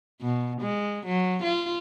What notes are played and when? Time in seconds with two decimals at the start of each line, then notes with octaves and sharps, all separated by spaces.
0.22 B2
0.61 G#3
1.06 F#3
1.43 F4